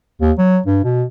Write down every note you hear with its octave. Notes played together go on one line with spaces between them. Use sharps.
D#2
F#3
G2
B2